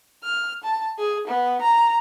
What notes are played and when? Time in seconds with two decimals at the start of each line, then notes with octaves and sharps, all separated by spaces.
0.23 F6
0.64 A5
0.99 G#4
1.27 B3
1.61 A#5